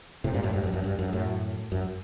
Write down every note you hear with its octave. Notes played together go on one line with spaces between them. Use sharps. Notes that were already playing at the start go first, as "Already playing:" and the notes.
A2 C3
G2 A#2
F#2 A2
G2
F#2
F#2
G2
F#2
F#2 A2
F#2